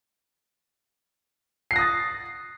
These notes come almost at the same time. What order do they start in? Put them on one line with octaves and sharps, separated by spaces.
C7 F#6 A#6 D#6 A6